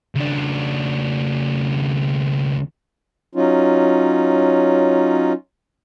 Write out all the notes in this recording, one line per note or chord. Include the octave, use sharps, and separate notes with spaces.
C#2 D4
F#3 C#4 D#4 F4